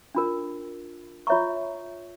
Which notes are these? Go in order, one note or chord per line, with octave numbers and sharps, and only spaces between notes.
D4 F4 A#4
F4 C#5 E5 A#5 C#6